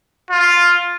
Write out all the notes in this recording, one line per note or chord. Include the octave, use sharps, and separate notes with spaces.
F4